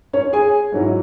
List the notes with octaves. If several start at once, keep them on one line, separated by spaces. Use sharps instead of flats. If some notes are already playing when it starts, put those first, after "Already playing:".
C#4 C#5
G#4 G#5
G#2 F#3 C#4 E4